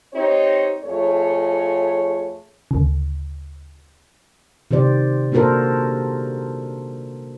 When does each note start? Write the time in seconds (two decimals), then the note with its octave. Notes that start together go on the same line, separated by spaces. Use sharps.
0.13 C4 D#4 G4 C#5
0.84 F2 A3 G#4 C#5
2.71 D2 C#3
4.71 C3 D#3 G4 C5 D5
5.32 A#3 D4 F#4 A4 A#4 C5